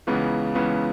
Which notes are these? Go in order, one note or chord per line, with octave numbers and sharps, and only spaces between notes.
C#2 C#3 E3 B3
C#2 C#3 E3 B3